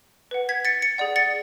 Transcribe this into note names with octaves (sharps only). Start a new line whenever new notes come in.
B4 F#5
G#6 B6
A6 C#7
A6 C#7
G#4 D5 F#5
A6 C#7